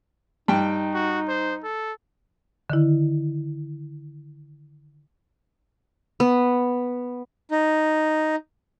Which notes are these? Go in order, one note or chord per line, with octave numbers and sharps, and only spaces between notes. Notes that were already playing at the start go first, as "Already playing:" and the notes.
G2 D#4 G5
F#4
C5
A4
D3 D#3 E4
B3
D#4